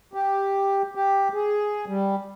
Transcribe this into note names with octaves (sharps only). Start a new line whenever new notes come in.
G4
G4
G#4
G3